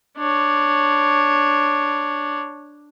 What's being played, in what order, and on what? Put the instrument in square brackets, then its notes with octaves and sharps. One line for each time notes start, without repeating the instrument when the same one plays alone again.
[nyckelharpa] D4 C#5